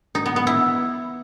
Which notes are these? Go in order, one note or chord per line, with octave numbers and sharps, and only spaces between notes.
D#4
B3
B3
E4